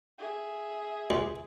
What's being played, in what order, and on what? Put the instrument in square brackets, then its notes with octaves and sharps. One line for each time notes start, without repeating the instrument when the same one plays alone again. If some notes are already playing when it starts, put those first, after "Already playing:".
[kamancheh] G#4 E5
[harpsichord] C#2